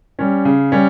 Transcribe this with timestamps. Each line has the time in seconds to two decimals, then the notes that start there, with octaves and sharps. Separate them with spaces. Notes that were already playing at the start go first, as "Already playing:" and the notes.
0.19 G3 C#4
0.45 C#3
0.72 G3 C#4